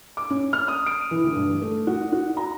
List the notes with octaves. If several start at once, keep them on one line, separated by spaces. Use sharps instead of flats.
D6
C#4
F6
D#6
D7
E3
D2
G2
A3
F#4
F#4
A#5